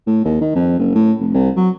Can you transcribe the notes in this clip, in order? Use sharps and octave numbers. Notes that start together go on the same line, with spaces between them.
A2
D#2
D#3
F2
F#1
A2
F1
C2
F#3